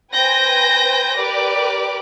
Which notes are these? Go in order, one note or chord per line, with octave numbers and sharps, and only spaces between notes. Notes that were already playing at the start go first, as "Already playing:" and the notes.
B4 C5 G5 G#5 G6 A#6
G4 A#4 B4 D5 D6